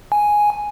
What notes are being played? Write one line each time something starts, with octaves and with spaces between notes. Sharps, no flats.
G#5